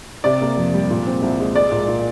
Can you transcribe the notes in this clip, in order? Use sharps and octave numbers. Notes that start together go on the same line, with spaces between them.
C3 D5
A#3
F2
G3
A#2
C4
C2
G#3
G#3 D5
A#2
A#2